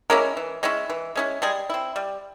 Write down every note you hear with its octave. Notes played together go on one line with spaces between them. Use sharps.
G#3 A#3 C#4 E4 A#4
E3
G#3 C#4 E4
E3
G#3 C#4 E4
G3 G#3 G#4
C4 E4
G3